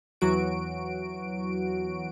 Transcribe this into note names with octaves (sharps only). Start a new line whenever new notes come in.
E2 E3 F#3 F#4 D7